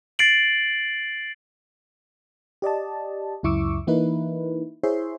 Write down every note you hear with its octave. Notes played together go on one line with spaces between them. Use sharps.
A6 C7 D7 F#7
G4 D5 D#5 A5
C#2 F#2 E4 C#6 D6 E6
E3 A#3 D#4 E4 B4
E4 G#4 C5 C#5 E5 C6